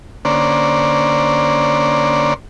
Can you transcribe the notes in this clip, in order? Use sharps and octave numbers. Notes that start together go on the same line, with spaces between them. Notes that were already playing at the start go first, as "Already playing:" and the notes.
D3 A#3 C#4 C5 D5